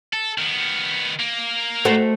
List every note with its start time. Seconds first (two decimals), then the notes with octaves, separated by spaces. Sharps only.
0.13 A4
0.38 D#3 B3
1.20 A#3
1.85 A3 F#4 C5